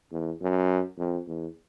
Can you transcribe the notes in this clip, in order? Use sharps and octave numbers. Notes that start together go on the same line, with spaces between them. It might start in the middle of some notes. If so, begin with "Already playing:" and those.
E2
F#2
F2
E2